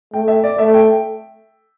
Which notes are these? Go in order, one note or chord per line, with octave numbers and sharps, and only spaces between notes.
A3 G5
E5
D5
A3 E5
G5